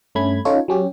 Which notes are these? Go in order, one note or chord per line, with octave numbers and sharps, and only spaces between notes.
G2 A3 C#4 B5 G#6
C#4 D#4 F4 A4 C#5
F#3 C#4 G4